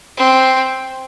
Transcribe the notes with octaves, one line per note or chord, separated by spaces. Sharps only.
C4